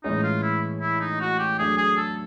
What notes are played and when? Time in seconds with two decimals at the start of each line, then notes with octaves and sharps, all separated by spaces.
0.04 A2 E3 G#3 C#4 D#4
0.23 F4
0.43 E4
0.81 E4
1.00 D#4
1.21 F#4
1.39 G4
1.59 F#3 A3 D4 G#4
1.78 G#4
1.97 A4